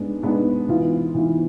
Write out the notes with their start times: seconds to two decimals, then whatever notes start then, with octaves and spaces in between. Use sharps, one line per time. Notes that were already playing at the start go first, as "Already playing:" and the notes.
Already playing: G#2 G#3 B3 D4
0.23 G#2 G#3 B3 D4
0.68 G#2 E3 B3 F4
1.14 G#2 E3 B3 F4